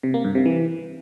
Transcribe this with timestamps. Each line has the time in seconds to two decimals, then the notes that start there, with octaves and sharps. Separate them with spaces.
0.03 C3
0.14 A#3
0.24 G2
0.35 C3
0.46 E3